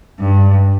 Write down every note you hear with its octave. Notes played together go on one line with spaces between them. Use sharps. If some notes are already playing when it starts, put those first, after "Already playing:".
G2